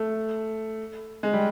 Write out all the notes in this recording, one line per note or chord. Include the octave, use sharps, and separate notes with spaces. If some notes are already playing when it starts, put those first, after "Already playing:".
Already playing: A3
G#3
G3